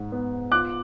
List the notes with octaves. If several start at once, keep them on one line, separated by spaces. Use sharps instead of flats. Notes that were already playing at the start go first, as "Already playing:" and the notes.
Already playing: G#2
B3
F4 D6 F#6